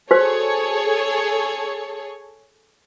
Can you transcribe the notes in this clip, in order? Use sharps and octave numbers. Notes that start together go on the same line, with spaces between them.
F#4 G#4 A4 C5 C#5